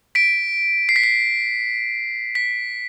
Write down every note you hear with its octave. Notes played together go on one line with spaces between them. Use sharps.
B6 D7
C7
B6
C7
B6